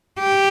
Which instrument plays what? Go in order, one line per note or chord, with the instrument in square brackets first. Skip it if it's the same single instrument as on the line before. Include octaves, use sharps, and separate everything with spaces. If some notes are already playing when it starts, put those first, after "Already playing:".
[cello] G4